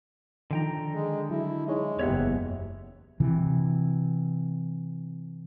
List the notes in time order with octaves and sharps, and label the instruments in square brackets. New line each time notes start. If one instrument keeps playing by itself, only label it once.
[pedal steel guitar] D3 G5 A#5 [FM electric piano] D#3 F3 D#4
[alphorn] G#3
[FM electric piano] F#3 [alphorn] E4
[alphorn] G#3 [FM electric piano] D#4 C#5
[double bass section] F#1 E2 [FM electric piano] B3 G4 [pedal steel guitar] C#5 E5 F#5
[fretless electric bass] C3 E3